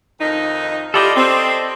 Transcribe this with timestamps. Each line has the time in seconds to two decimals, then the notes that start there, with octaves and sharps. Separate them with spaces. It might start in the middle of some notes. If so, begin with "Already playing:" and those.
0.20 F2 D#3 D#4
0.94 E4 F4 G4 A4 D5 D#5
1.15 C4